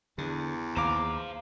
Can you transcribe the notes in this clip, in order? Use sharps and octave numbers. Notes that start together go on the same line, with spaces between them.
E2 D3
D#2 C5 F5 A#5 D6